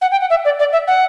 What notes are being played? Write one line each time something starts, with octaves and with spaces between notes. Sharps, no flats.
F#5
G5
F#5
E5
D5
D5
E5
F#5